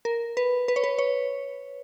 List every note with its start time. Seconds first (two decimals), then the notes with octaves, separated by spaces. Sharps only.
0.05 A#4
0.37 B4
0.68 B4
0.76 C#5
0.84 B4
0.98 C#5